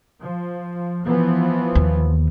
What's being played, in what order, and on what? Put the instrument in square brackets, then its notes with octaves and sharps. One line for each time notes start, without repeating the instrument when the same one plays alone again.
[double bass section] F3
E3 F3 B3
[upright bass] D#2